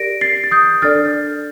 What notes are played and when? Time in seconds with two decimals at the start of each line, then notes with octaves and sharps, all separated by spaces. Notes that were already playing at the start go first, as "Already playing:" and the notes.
Already playing: G4 A#4 D5 A#6 D7
0.21 A6 C7
0.44 A6
0.51 D#6 G6
0.82 D4 A4 D5 F6 A6